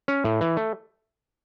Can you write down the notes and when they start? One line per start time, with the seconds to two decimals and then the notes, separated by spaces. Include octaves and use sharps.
0.08 C#4
0.24 A2
0.41 E3
0.57 A3